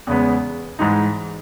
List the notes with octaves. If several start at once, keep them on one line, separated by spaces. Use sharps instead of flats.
E2 C#3 G#3 B3
G#2 E3 G#3 D#4